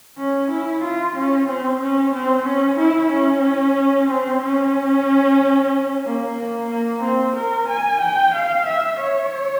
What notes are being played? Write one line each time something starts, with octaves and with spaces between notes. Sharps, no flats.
C#4
E4
F4
C#4
C4
C#4
C4
C#4
E4
C#4
C4
C#4
A#3
A#3
A#3
C4
A#4
G#5
G5
F5
E5
C#5